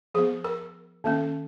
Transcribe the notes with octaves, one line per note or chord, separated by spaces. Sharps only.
F3 B3 G#4
A#4
D#3 A#3 C#4